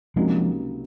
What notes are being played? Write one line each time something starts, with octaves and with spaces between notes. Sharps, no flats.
C#2 C3 F3 F#3 G#3 A#3 D#4